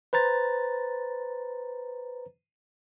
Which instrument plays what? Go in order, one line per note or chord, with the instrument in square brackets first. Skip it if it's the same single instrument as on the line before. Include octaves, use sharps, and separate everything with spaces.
[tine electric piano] B4 C5 A#5 A6